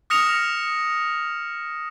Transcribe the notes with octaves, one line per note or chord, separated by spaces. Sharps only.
D#6 F6 A#6 C#7 E7 F7